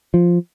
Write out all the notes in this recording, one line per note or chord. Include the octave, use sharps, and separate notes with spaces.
F3